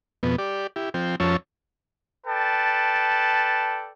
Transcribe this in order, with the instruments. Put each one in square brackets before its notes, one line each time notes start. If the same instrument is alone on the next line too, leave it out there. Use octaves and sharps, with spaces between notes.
[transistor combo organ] F2 B2 B3
G4 D5
E4 G4
F3 C4 G5
F2 F3 C#4 C#5 A5 E6
[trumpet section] A4 B4 D5 G5 A5